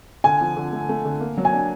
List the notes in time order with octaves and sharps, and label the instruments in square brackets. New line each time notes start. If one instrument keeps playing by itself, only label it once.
[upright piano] D3 [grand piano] G#5
[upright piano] F3
D3
A3
A3
D3
A#3
F#3
[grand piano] G#5
[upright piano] D4